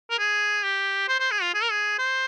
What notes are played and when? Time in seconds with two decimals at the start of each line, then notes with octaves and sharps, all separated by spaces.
0.10 A#4
0.19 G#4
0.63 G4
1.08 C5
1.20 C5
1.31 G#4
1.42 F4
1.54 G#4
1.63 A#4
1.71 G#4
1.99 C5